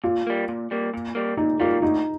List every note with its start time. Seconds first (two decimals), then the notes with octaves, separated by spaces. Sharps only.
0.04 A#2 F4
0.27 G3 A#3
0.49 A#2
0.71 G3 A#3
0.94 A#2
1.15 G3 A#3
1.37 A#2 D#4
1.60 G3 A#3 F4
1.82 D2 D#4